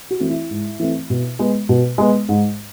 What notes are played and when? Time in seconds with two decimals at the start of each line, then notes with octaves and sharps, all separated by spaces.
0.11 F#4
0.20 E3 A3 C4
0.30 E4
0.51 G#2
0.80 E3 A3 C4
1.10 B2
1.39 G#3 B3
1.69 B2
1.98 G#3 B3
2.29 G#2